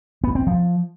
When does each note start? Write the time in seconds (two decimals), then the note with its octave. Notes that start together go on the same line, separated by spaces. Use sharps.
0.24 B3
0.35 C4
0.47 F3